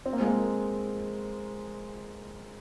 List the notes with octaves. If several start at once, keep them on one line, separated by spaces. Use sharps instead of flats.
C4
A#3
G#3
A#3